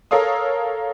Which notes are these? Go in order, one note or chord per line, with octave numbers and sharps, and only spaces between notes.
A4 A#4 C#5 F5 D#6